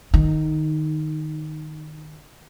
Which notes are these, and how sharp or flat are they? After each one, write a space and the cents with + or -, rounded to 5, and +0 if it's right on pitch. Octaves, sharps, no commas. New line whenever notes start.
D#3 -25 D#4 +0